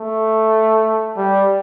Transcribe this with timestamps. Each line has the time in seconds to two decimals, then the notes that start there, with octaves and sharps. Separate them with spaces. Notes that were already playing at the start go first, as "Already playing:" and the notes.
Already playing: A3
1.17 G3